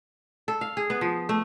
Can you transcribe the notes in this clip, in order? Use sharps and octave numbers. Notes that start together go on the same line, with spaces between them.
A4
F5
G#4
B3
F3
A3